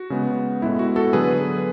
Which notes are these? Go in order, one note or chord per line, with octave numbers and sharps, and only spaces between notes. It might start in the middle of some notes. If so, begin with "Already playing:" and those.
Already playing: F#4
C#3 G#3 B3
A2 G#3 B3 E4
F#4
F#4 A4
D3 F#3 B3 G#4 B4